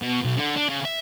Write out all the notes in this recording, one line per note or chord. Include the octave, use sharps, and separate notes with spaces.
B2
B1
D3
D4
C#3
E5